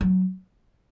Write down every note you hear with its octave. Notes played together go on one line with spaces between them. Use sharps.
F#3